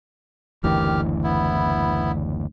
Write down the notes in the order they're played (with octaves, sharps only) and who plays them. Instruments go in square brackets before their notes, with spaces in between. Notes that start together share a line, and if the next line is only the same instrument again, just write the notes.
[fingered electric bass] F#1 D2 E3 [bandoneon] D#3 G4 F6
[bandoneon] B3 E4